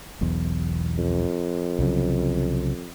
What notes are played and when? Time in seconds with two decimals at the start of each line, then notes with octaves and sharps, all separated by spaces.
0.21 E1 B1 E2
0.98 F2
1.79 C2 C#3 F#3